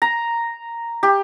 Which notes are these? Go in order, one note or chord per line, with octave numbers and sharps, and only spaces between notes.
A#5
G4